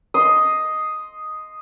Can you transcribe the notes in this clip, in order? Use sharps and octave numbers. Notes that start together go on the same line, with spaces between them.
D#5 C6